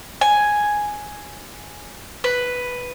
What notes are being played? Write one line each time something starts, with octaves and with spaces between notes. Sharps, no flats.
G#5
B4